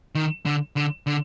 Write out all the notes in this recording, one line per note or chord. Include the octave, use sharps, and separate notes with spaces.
D#3
D3
D3
D3